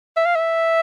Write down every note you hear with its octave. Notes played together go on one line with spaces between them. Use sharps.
E5
F5
E5